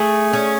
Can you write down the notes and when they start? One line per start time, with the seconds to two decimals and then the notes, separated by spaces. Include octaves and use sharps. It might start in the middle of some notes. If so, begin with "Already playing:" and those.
Already playing: A3 G#4
0.33 C#4